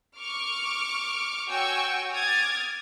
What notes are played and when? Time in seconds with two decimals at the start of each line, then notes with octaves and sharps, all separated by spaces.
0.17 C#6 D6 F6
1.49 F#4 C#5 G5 G#5 C#6 E6
2.11 D6 D#6 F6 G#6 A6